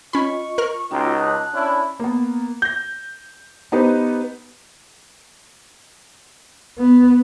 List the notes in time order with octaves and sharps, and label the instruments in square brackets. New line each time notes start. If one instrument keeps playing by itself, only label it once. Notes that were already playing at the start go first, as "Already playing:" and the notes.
[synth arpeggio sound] C#4 B5 [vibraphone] F4 D#5 [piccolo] C#6
[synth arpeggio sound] A#4 F6
[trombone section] C#2 D#4 [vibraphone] C#4 F4 F#4 [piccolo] G5
[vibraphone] A5 [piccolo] F#6
[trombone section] C#4 D4 E4
[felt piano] A#3 B3
G6 A#6
B3 D#4 G4 B4 C5
[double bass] B3